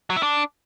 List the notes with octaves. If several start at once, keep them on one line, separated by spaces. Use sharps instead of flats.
F#3
E4
D4